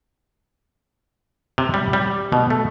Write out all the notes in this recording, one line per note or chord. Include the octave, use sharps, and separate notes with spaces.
C3
G3
G3
B2
A3